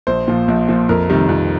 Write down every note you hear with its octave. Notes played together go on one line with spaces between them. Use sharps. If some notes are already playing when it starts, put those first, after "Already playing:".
A#1 C5
A#2 F3
A#1
A#2 F3
F2 A#4
C3 D#3 G3
F2